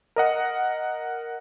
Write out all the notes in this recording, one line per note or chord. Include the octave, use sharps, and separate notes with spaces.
A#4 D#5 F#5